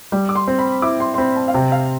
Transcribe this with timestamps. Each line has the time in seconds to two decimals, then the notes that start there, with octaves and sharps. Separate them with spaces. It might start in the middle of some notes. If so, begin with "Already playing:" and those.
0.12 G3
0.29 D6
0.36 C6
0.48 C4
0.59 B5
0.82 E4 D6
1.00 C6
1.14 C6
1.18 C4 B5
1.36 A5
1.48 F5
1.54 C3 G5
1.72 F5